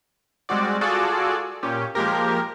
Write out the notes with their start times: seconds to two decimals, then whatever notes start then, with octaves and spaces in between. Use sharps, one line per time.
0.49 G3 G#3 C4 F#4 D5
0.81 F4 F#4 G#4 A4 D5
1.63 A#2 C#4 G4
1.95 F3 G#3 A#3 G4 A#4